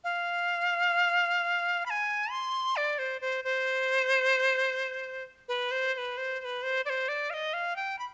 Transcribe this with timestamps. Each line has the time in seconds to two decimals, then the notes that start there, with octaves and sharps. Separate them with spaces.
0.04 F5
1.86 B5
1.90 G#5
2.31 C6
2.76 D5
2.99 C5
3.21 C5
3.44 C5
5.48 B4
5.71 C5
5.94 C5
5.98 B4
6.17 C5
6.40 C5
6.45 B4
6.63 C5
6.85 D5
6.90 C5
7.09 D5
7.30 F5
7.34 D#5
7.53 F5
7.76 G5
7.99 B5